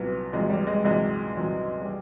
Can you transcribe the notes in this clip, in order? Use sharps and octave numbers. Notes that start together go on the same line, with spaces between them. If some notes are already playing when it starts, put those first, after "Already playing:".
Already playing: C2 A#2 F#3 B3
C2 A#2 F#3 G#3
G3
G#3
C2 A#2 F#3 G#3
C2 A#2 F#3
G3